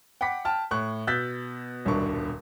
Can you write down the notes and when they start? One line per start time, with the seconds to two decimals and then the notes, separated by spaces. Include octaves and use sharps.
0.21 F#5 G5 B5 D6 B6
0.45 G5 A5 F6
0.71 A2 C#6 F#6
1.07 B2 E6 F#6 G6 A6 B6
1.85 D#1 C2 G2 B2 D4 C#6